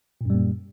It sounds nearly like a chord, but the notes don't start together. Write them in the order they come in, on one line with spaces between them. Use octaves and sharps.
A#2 F#2 G3 A#3